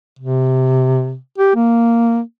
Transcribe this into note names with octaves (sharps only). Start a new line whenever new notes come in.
C3
G4
A#3